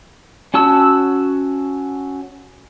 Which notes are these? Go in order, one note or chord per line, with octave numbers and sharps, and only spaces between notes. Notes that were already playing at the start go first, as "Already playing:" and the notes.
C#4 F#4 A5 E6